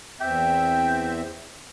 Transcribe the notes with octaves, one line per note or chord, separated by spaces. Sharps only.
E2 C4 E5 G5